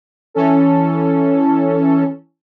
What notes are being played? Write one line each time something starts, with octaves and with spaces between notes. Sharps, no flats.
E3 C#4 A4